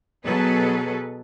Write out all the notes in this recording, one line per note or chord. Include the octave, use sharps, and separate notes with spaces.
B2 F#3 G#4 A4 B4